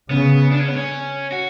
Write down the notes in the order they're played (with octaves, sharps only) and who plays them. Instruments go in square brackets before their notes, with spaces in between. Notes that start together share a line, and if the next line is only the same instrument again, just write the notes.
[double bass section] C#3 [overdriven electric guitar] B3
[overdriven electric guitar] D4
C#4
B3
C#4
F#4